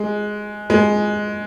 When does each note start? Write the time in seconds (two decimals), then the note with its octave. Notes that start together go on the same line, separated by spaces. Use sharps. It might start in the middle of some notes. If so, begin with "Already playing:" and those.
Already playing: G#3
0.70 G#3